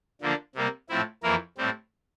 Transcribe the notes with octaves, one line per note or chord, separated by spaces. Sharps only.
D3 F3 A#3 D4
C3 G3 A#3
A2 F3 C4 E4
F2 E3 A#3 E4 A#4
A2 G3 C4